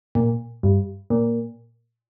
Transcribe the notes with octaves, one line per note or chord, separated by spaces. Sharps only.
A#2
G2
A#2